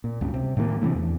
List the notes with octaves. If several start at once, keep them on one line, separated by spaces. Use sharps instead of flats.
A#2
C#2 G2
C3
A2 D#3 G3 A#3
C3 D#3 E3 A3
E2